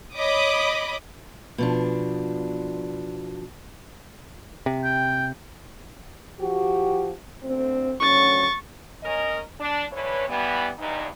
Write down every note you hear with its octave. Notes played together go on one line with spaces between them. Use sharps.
C#5 D#5 B5 D6 D#6
B2 F3 D4
C3
G5
F3 F#4 G4
D2 C4
D2 F#3 C#4 C#6 A6
C#4 A#4 D#5
D4
D3 E3 B4 C#5
E3 G3 B3
E2 G2 D#4